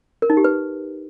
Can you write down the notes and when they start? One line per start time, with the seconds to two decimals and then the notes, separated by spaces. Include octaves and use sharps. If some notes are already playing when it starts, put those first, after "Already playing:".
0.22 A#4
0.30 D#4
0.37 G4
0.44 B4